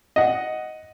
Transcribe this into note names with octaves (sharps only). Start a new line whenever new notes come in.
D#5 F#5